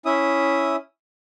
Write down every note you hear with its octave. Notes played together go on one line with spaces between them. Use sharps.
C#4 E4 E5 D#6